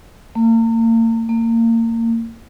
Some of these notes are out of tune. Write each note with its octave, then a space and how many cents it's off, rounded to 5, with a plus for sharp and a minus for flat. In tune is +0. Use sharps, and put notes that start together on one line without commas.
A#3 -40
A#3 -30